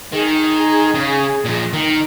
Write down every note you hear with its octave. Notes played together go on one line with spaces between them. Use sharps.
D#3 G#4
C#3
A#2 F3
D#3